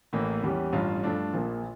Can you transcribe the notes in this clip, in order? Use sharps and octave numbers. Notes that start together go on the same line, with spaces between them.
A1 A2 E3 A#3
E2 E3 G3 C#4 G4
A1 G2 F3 C#4 F4
G2 F3 A3 D4 F4
A#1 A#2 F3 A#3